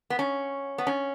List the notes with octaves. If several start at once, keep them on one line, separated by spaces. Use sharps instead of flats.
B3
C#4
B3
C#4